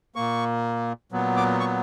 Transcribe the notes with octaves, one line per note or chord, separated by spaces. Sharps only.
A#2 A#3 C#6
A#2 F#3 B3
D6
C#6